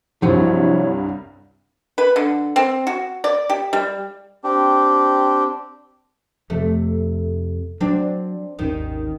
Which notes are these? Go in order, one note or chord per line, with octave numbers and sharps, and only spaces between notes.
C2 G2 F3 F#3 E4 C#5
B4
D3
C4
F#4
D5
G4
G3
C4 D4 G4
F2 C3 A3
F#3 C4 D4
G#1 D#2 D#3 C#4